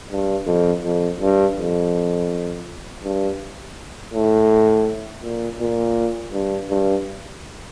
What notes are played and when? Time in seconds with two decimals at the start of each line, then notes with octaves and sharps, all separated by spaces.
0.11 G2
0.46 F2
0.83 F2
1.21 G2
1.57 F2
3.03 G2
4.13 A2
5.23 A#2
5.60 A#2
6.33 G2
6.69 G2